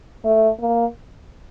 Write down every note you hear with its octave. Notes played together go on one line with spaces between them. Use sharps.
A3
A#3